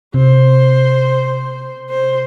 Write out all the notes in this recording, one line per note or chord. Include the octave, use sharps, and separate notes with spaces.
C3 C5
C5